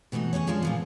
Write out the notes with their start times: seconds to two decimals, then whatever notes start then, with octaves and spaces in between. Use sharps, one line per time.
0.12 B2 E3 A3 D#4 F#4
0.33 C#4 D#4 G#4 C#5
0.47 F3 G#3 C#4 D4 F4
0.62 A#2 F3 B3